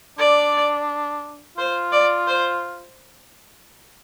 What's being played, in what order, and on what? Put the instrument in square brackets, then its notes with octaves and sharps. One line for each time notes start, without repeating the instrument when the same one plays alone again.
[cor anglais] D4 [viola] D5
[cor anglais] F4 [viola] C5
[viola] D5
C5